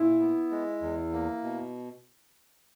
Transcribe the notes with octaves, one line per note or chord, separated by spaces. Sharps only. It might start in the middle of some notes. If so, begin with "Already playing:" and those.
Already playing: A#2 E4
B3
G#3
E2
A#3
B2